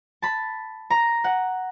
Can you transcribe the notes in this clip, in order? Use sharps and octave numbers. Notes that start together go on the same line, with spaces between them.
A5 B5
A#5
F#5